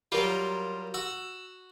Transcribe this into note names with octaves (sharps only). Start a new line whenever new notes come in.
F#3 G3 F4 A#4
F#4 E6